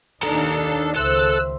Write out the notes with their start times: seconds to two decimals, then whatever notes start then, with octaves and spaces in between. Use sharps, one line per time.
0.23 D#2 D#3 D4 D#4 A4 A#5
0.96 C#2 D#3 A4 C5 E5 C6 E6 F#6